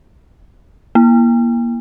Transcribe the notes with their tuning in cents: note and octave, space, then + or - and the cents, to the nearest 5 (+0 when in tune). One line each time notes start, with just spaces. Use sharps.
A#3 +20